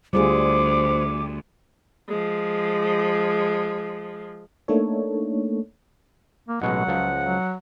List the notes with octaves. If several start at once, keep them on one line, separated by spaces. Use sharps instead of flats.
D2 G3 F4 G#4 C5 D6
F3 G#3
A3 A#3 D4 D#4 A4 C#5
A#3
A1 B2 F#3 G#3 F#5
C#2 F3
F#3